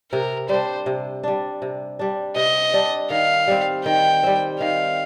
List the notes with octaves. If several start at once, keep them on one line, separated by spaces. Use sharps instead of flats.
C3 A#4
G3 D4 C5
C3
G3 D4
C3
G3 D4
C3 D#5
G3 D4
D#3 F5
G3 C4
D#3 G5
G3 C4
D#3 F5